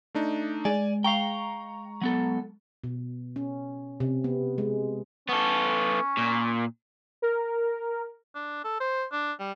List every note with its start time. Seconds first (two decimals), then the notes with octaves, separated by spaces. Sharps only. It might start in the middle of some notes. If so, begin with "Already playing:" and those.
0.15 A3 D4 D#4
0.65 G#3 D5 G#5
1.04 F5 G5 A#5 C#6
2.02 F#3 B3 A4
2.84 B2
3.36 C#4
4.00 C3
4.24 B3
4.58 G#3
5.29 B3 C#4 A4
6.18 A#2
7.22 A#4
8.35 D4
8.64 A4
8.80 C5
9.12 D4
9.40 G3